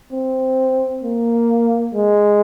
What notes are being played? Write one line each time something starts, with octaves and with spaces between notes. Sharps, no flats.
C4
A#3
G#3